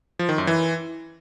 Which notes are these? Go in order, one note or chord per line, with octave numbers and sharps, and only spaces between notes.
F3
D#3
F#2
E3